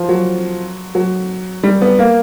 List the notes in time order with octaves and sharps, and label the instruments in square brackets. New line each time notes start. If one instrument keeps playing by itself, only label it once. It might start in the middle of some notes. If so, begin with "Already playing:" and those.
Already playing: [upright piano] F3
F#3
F#3
G3
B3
A#3